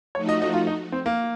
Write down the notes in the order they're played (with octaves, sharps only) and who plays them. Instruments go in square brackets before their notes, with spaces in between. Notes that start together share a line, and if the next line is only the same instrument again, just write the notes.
[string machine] F3 A3 D#4 F#4 [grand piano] C#5
[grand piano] D#5
D#5
F4
D#4
C4
A#3